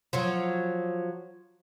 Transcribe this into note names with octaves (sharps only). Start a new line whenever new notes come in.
F3 F#3